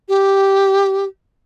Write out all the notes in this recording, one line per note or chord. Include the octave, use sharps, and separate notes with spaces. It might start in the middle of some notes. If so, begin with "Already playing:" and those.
G4